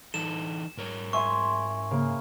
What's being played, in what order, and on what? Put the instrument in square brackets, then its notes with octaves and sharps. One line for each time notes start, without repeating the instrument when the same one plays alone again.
[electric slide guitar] E3 D#4 A4 [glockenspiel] E7
[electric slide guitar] G#2 A#4 C#5
[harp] E5 G#5 C6 [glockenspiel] C#6
[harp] C#3 A#3